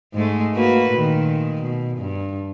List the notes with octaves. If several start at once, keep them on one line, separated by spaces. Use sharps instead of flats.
G#2 G#3 A3
A#3 F#4 B4
A#2 D#3
B2
G2